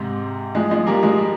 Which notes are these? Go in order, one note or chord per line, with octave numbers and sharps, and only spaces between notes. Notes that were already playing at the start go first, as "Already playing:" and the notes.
Already playing: G#2 C3
F3 G#3
F3 G#3
G3 A#3
F3 G#3